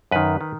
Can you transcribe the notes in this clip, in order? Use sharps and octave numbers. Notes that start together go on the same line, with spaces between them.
F#2 D#3 B4
D#3